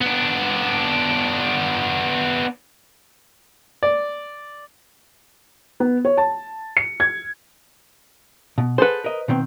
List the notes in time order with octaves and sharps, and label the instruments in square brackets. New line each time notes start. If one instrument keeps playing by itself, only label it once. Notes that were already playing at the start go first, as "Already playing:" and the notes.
[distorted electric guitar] B3 D4
[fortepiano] D5
[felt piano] B3
C#5
A5
C#7
G#6
[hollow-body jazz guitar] B2
[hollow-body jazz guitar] G#4 A4 F#5 [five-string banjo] B4 C5
[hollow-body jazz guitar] A#4 D#5
B2 D#3 C4